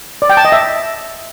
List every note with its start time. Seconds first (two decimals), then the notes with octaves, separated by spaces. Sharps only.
0.22 D5
0.30 G5
0.37 A5
0.45 D#5
0.52 E5